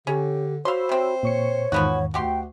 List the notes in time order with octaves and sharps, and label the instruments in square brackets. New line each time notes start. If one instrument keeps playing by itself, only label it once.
[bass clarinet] D3 [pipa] C#4 [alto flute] G4
[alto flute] F#4 [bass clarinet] C5 [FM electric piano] C#5 B5 E6 [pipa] F5 C6
[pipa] C3 C4
[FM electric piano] A#2 C#6 C#7 [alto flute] C#5
[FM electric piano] E2 G#2 D#3 [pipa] F3 B3 F#4
[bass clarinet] D2 [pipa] F#4 G4 C6 [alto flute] G5